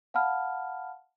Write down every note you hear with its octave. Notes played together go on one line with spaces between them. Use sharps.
F5 F#5 A5 B5 F6